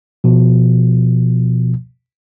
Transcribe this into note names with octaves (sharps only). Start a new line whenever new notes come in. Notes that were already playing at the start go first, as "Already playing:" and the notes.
B2 F3